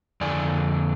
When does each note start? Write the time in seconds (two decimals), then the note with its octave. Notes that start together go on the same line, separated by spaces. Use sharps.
0.21 F2 D3 D4 D5 G#5